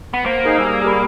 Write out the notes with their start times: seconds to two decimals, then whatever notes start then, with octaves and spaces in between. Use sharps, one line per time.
0.14 B3
0.26 A#3 C5
0.45 D#4 G#4 A#4 F5
0.58 G3 G#4 E6
0.84 G4 A#4 B5